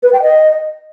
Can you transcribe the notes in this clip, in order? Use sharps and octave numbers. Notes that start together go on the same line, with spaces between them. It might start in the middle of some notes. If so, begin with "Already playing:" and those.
B4
G5
D#5